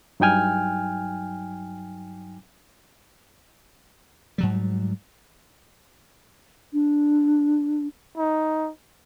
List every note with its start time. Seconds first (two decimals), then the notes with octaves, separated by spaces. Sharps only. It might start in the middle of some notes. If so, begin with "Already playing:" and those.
0.20 G2 F#3 D#4 G5 G#5 F6
4.38 G#2 F#3 G3
6.73 D4
8.17 D#4